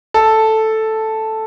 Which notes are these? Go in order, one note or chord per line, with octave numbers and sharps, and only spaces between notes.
A4